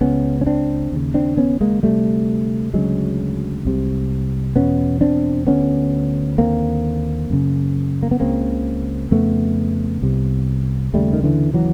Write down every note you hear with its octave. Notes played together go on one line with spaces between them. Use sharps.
C#2 C#3 B3 C#4
C#4
C4 D4
D#2 C#3
C4 D4
B3 C#4
G#3 A#3
D2 C3 G3 A3
D2 C#3 F#3 G#3
C2 C3
E2 B2 B3 C#4
C4 D4
D2 D3 B3 C#4
D#2 D3 A#3 C4
F#2 C#3
A#3
B3
C#2 C#3 A#3 C4
F2 C#3 A3 B3
C2 C3
D#2 C#3 G3 A3
D#3
D3 E3
E3 F#3